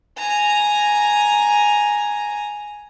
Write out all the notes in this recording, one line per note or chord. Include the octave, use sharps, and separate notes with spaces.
G#5 A#5